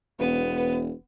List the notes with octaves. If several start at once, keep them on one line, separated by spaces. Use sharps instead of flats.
E1 B3 B4